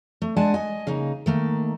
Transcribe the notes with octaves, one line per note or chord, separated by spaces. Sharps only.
A3
G#3 D4 F#5 G#5 A5
D#5 G#5
C#3 A#3 D#4
D#3 A3 A#3